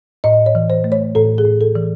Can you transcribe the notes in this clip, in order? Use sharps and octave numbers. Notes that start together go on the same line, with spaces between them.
A2 D#5
C#5
E3
C5
A3
C#5
A2 A4
G#4
A2
A4
E3